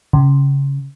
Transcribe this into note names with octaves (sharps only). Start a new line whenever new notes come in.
C#3